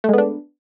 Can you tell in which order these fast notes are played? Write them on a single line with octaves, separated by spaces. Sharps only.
A3 G#3 B3 D4